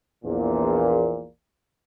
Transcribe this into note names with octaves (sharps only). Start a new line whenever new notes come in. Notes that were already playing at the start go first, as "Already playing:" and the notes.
A#1 E2 A#2